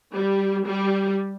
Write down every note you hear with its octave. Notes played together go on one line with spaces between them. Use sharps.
G3
G3